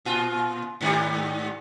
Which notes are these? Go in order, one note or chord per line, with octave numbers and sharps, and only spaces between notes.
A#2 F4
G#2 D#3 G3